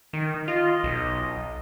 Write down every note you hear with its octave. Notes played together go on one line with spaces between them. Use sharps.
D#3
F4 D#5
B1